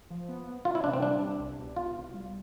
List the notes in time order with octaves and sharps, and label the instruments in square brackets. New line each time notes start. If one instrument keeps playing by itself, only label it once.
[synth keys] F3
B3
B3
[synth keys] B3 [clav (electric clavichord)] F4
[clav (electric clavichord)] E4
[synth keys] C3 [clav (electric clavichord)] D4
[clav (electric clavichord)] C4
[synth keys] G3 [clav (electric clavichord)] D4
[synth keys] G3
C2
B2
[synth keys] B2 [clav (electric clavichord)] F4
[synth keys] C2
G3